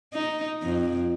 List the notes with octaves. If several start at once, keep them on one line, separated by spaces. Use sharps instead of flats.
D#4
F2